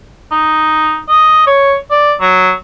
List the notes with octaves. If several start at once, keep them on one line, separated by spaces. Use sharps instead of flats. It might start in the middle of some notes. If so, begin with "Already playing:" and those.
D#4
D#5
C#5
D5
F#3